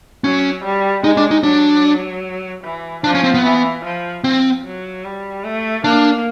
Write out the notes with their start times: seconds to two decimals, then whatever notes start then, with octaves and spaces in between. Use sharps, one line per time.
0.24 F#3 C#4
0.64 G3
1.04 G#3 D#4
1.17 D4
1.31 D#4
1.43 F#3 D4
2.64 E3
3.04 F3 D4
3.15 C#4
3.24 C4
3.34 B3
3.44 E3
3.85 F3
4.24 F3 C4
4.65 F#3
5.05 G3
5.44 A3
5.84 A#3 D4